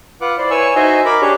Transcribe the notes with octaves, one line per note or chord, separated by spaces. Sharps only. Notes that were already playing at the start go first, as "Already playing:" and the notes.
F4 B4 F#5 D6
E4 C5 D5
E4 B4 C#5 G#5 C#6 E6
D#4 F#4 C5 D#5 E5 G#5
A#4 B5 D6
D4 G4 G#4 C#5